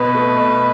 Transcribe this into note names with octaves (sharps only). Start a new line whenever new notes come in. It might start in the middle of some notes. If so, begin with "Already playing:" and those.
Already playing: B2 B3 B4
A3
B2